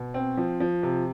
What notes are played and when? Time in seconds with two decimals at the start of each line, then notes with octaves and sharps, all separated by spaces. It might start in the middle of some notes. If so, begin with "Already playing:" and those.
Already playing: B2
0.14 C4
0.37 F3
0.60 F3
0.83 C3